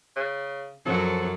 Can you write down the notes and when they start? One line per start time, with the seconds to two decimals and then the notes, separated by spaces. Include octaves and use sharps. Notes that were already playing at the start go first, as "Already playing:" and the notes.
0.17 C#3
0.86 F#2 F3 F#3 A4 F#5